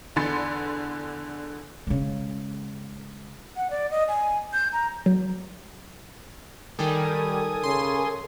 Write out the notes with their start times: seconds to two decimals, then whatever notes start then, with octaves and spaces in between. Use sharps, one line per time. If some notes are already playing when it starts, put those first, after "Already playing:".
0.16 E2 D3 B5 C6 A6 C#7
1.87 C#3 G#3
3.57 F#5
3.70 D5
3.91 D#5
4.08 G#5
4.53 G6
4.73 A#5
5.06 F#3
6.79 D#3 G3 A4 A#4 G#5 D#6
7.64 C#3 C6